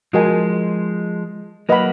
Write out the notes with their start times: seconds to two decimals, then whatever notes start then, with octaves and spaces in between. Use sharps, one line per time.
0.13 F3 G#3 F#4 A#4 D#5 G#5
1.69 F#3 A#3 B4 D#5 F#5 B5